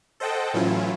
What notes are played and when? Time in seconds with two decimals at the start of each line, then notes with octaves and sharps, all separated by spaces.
0.20 A4 C5 D#5 F#5 G5 A5
0.54 A2 E3 F#3 C#4 E4 F4